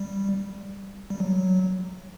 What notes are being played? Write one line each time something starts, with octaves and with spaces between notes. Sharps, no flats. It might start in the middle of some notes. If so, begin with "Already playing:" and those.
Already playing: G3
G3
F#3